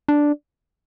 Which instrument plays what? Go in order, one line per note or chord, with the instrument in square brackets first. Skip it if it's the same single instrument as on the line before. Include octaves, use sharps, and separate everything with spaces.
[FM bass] D4